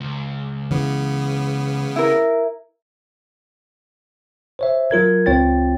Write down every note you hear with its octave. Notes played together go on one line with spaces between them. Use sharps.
C#2
C#3 E3 B3
E4 A#4
C5 C#5 E5
F#3 F4 A#4 G#6
C#2 C4 F4 C#5 G5 A6